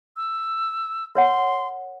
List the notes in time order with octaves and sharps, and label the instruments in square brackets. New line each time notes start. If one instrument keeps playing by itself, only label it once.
[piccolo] E6
[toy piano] A#4 C#5 F#5 [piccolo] C6